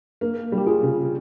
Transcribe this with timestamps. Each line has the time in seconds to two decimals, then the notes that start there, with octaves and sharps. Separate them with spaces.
0.21 A#3
0.52 G3
0.58 G4
0.67 F4 G#4
0.83 C#3